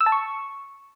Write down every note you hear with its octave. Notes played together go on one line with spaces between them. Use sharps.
E6
A5
C#6